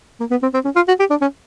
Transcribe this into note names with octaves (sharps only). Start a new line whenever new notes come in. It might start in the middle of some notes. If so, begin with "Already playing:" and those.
A#3
B3
C4
C4
C#4
F4
F#4
G4
D4
C#4